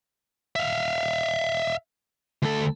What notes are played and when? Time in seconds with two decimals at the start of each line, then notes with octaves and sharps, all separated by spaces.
0.56 E5 F5
2.42 D2 A4